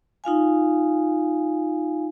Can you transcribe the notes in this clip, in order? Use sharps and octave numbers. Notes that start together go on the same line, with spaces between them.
D#4 F4 F5 G#5